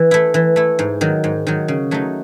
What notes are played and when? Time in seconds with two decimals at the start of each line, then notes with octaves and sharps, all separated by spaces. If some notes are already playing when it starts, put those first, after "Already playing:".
Already playing: E3
0.11 A3 E4
0.34 E3
0.56 A3 E4
0.79 G#2
1.01 D#3 F#3
1.24 G#2
1.47 D#3 F#3
1.68 C#3
1.91 F#3 A3 D#4